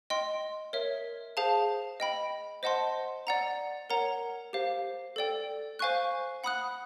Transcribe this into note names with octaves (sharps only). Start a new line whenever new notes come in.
D#5 G5 C6
A#4 C#5 E5
G#4 C5 F5 A5
D#5 G5 B5
C5 D#5 F#5 A5 C6
D5 F#5 A#5
A#4 C#5 F#5 A#5
G4 C5 F5
A4 D5 G5
C5 F5 G#5 C#6 F#6
F#5 B5 D#6 F#6